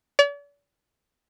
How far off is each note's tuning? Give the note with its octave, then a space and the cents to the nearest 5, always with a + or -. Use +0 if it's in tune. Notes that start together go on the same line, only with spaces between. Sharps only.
D5 -45